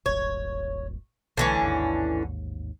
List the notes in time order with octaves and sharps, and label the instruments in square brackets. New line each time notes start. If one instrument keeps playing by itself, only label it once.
[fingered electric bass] D#1 G#1 [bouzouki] C#5
[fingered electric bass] B1 G3 A3 [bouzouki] D3 E3 C#4
[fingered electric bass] A1 D#2 G#2